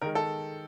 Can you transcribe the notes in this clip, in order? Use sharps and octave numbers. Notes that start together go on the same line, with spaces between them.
D#3 G#3 A#4
A4